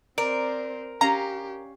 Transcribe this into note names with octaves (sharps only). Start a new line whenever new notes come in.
C4 A#4 C5 D5
C#4 G4 F5 A#5